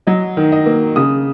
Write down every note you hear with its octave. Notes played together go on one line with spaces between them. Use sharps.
F#3 D#5
D#3
D#5
A#3
C#3 D#6